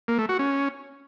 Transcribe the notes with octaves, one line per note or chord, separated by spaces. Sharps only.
A#3
A3
F#4
C#4